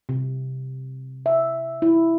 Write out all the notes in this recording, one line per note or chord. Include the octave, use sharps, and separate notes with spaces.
C3
E5
E4